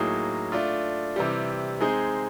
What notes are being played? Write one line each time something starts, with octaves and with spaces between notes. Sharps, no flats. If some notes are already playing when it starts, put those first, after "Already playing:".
Already playing: A2 F#3 A#3 D#4 G#4
A3 D4 F4
C3 E3 G3
G#3 C4 D#4 G#4